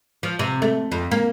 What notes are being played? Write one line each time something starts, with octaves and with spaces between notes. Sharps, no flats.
F3
C3
A3
F2
A#3